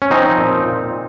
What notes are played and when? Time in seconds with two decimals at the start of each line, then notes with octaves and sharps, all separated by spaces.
0.02 C#4
0.10 F3 C4 D#4
0.38 A#2
0.66 A#2